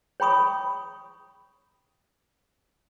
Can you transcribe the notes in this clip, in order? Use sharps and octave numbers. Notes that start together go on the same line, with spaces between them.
C#5 G5 B5 C#6 D#6